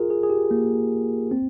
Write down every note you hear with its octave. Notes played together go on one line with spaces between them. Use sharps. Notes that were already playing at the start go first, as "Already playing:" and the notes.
Already playing: F4 G#4 A#4
G#4
G#4
G4
A#3
C4